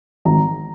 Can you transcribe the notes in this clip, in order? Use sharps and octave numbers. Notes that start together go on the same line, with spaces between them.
G#1 A#5